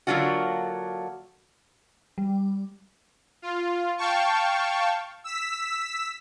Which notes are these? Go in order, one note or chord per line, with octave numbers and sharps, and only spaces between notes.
D3 F#3 A#3 D4 F4 F#4
G3
F4
F5 G5 A5 C#6
E6 B6